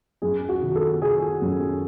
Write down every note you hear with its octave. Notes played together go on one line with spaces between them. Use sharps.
F#2 G#4
F#4
D#3
A4
D#3 G#4
F#2